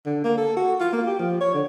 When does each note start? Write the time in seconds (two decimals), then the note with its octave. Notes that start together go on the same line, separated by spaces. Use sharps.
0.06 D3
0.24 A#3
0.38 A4
0.57 F#4
0.80 F4
0.93 A#3
1.07 G4
1.19 F3
1.41 C#5
1.54 D3